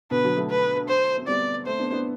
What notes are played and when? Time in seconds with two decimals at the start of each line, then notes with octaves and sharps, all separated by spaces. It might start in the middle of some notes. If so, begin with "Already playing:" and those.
0.11 B2 D3 B4
0.24 D3 F#3
0.37 F#3 A3
0.50 B4
0.89 C5
1.18 C4
1.28 G3 B3 D5
1.66 A3 C4 C5
1.79 B3 D4
1.92 B3 D4